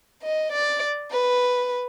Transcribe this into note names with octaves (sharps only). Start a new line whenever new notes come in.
D#5
D5
B4